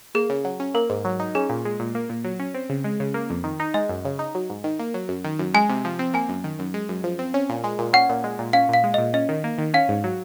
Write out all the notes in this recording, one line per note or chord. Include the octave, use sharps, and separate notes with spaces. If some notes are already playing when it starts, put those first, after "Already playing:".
A#3 G#4
C#3
F#3
C#4
A#3 A#4
G#2
F#3
D#4
C#4 G#4
A#2
G#3
A#2
A#3
A#2
F#3
C#4
C4
C#3
G#3
C#3
A#3
F2
D#3
D#4
G#3 D#5
F#2
C#3
D#4
F#3
G#2
D#3
A#3
F#3
F#2
D#3
F#2
G#3 G#5
C3
F3
C4
A#3 G#5
F#2
D#3
F#2
G#3
F#2
F3
C4
C#4
A#2
G#3
A#2
C#4 F#5
A#2
G#3
A#2
C#4 F5
A#2 F5
G#3
D#5
A#2
C#4 D#5
D#3
A#3
D#3
C#4 F5
G#2
F#3